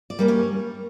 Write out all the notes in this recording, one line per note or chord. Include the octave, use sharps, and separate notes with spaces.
D5
G3 A#3 C#4
C#5